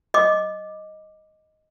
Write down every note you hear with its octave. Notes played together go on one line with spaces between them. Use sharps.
D#5 D6